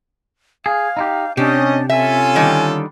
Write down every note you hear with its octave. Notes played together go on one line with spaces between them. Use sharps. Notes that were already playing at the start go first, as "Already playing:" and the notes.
G#4 F5
D#4 E4 G4
C3 C#4 D4 G4 D#5
C#4 F4 A4 E5 G#5
D3 D#3 G3